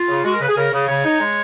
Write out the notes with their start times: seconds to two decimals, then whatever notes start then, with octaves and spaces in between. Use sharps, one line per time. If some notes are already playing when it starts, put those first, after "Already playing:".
Already playing: F4
0.08 C#3
0.25 G#3 F#4
0.33 A#4
0.41 C#3 B4
0.49 G#4
0.56 C#3 A#4
0.72 C#3
0.88 C#3 C#5
1.05 D#4
1.20 G#3